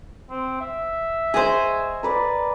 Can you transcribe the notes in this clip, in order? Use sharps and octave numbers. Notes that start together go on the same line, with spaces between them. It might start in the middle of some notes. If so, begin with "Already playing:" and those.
C4
E5
G#4 C5 D#5 G#5 C#6
A#4 B4 D5